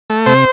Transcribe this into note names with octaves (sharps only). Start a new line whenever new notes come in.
A3
C3 C5